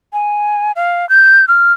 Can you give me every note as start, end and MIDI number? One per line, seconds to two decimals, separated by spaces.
0.13 0.72 80
0.76 1.08 77
1.09 1.45 91
1.48 1.73 89